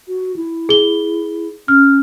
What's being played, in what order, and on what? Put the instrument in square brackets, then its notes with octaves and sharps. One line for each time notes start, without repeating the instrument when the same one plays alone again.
[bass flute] F#4
E4
[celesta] G#4 G7
[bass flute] C#4 [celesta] F6